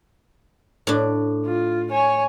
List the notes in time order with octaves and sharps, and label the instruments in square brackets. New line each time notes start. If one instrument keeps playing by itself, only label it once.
[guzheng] A2 D4
[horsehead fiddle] F4
C#5 G#5